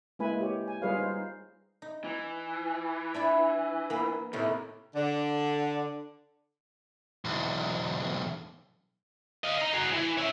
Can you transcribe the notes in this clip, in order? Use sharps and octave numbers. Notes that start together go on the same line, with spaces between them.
G#3 A#3 E4 B4 G#5 B5
G4 C#5
G#5
G3 F4 G#4 B4 C#5 F5
D#4 C5
D#4
E3
D4 E4 D5
A#3 B3
D#2 A2 C3 C4
D3
B1 E2
D#5 F5
D#5 A#5
F#4 G#4
E3
C#4 E5